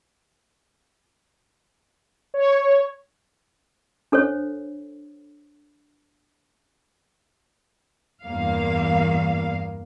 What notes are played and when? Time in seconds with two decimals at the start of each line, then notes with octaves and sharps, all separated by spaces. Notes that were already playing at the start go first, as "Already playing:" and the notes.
2.34 C#5
4.12 D4 A4 C5 C#5
8.22 E2 G2 A#3 F5